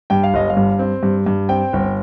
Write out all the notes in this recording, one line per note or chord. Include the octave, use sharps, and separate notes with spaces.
G2 G5
F5
G1 D#5
F5
G2
C4
G2
G2
C4 G5
G1